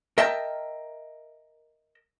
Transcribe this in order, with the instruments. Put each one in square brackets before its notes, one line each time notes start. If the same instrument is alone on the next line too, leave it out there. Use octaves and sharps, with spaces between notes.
[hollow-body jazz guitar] A#4 D#5 E5 G5 A5 A#5